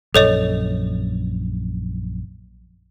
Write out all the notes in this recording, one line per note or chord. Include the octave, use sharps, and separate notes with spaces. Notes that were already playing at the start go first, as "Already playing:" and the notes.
A#1 F#2 A4 C#5 D#5